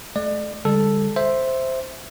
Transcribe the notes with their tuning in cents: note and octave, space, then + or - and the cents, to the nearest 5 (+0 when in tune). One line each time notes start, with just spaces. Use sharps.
A3 -40 D5 +35
D3 +0 G3 +45 A4 +0
C5 +0 E5 +0